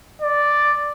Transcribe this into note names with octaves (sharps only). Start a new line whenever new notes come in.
D5